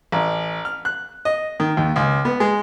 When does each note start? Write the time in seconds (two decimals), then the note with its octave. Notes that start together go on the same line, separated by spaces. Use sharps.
0.12 A1
0.65 F6
0.85 F#6
1.25 D#5
1.60 D#3
1.77 D#2
1.96 C#2
2.25 B3
2.40 G#3